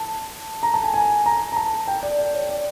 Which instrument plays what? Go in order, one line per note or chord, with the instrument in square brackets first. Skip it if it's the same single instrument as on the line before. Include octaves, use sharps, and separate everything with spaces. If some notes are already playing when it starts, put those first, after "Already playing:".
Already playing: [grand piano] A5
A#5
A5
G#5
G#5
A#5
A#5
A5
G5
D5
D5
C#5
D5